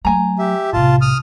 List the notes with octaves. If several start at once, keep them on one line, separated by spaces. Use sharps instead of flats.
F#3 A3 A#3 G#5 A#5
G4 E5
B1 A2 C3 F4 A5
D#6 F6